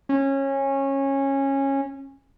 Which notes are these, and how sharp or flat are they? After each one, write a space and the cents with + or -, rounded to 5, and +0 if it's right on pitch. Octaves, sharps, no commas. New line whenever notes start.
C#4 -20